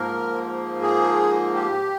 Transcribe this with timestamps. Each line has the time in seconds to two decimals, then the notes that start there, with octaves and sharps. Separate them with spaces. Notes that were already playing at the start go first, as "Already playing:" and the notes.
Already playing: G#2 F3 A#3 A#4
0.82 G#4
1.53 G4